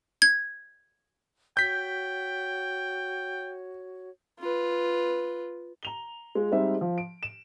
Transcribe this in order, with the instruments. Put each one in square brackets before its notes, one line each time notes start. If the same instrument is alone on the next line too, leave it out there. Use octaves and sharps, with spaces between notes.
[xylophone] G#6
[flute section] F#4 C#5 [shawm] G5 [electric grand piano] G6 B6
[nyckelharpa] F4 B4
[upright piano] A#5 F7 G7
G#3 F4
G3 G#3 C4 D#4 G#4 E5
F3
D7
E7